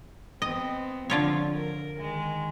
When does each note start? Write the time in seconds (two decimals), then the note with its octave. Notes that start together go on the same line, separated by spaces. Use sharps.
0.42 B3 C4 D#5
1.10 D3 F3 F4 C#5
1.55 A#4
1.98 D#3 G#3